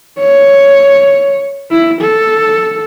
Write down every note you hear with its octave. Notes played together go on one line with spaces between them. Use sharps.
C#5
E4
A4